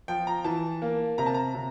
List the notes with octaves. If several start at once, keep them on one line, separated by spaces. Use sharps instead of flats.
F3 G5
A#5
E3 A5
A#3
C3 A#5
A5
A#5
C3